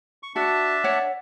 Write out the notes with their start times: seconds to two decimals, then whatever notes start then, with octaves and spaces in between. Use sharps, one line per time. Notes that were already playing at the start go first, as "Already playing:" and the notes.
0.23 C#6
0.36 D4 F#4 E5 A5
0.84 C#5 D5 F#5